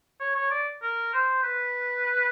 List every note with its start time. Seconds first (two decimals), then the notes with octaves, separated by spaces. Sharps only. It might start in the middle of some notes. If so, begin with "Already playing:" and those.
0.20 C#5
0.35 C#5
0.51 D5
0.82 A#4
1.13 C5
1.43 B4